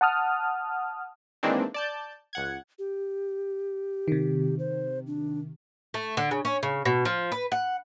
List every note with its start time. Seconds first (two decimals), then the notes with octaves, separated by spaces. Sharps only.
0.01 F#5 A5 D#6 F6
1.43 D#3 E3 G#3 A#3 C4 D4
1.74 D5 A5 G6
2.33 C#2 F#5 G#6
2.79 G4
4.08 C3 D#3
4.59 C5
5.07 D4
5.94 A3
6.17 D3
6.31 C#3
6.45 C#4
6.63 C#3
6.85 B2
7.05 F3
7.32 B4
7.52 F#5